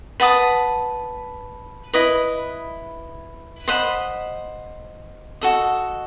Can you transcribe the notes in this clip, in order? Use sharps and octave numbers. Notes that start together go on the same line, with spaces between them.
B4 F#5 A5 D#6
E4 B4 D#5
C5 D#5 F#5 B5
F#4 A4 D#5